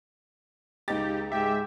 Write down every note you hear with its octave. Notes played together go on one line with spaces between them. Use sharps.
C#2 D#4 G4 A6
G#2 G4 E5